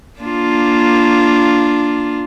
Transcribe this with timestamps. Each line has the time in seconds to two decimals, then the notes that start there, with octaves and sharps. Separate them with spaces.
0.20 A#3 D4 F4